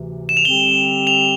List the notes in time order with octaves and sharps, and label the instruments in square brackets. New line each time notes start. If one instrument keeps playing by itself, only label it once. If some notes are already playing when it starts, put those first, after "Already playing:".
Already playing: [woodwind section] D2 C3 E3
[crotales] E7
F7
[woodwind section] D3 G3 C4 G4 [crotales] G7
[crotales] F7